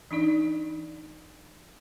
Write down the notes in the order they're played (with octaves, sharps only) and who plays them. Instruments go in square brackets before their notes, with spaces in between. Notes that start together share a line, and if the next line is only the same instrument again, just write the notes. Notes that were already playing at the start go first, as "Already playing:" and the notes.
[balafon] E3 D4 D#4 D5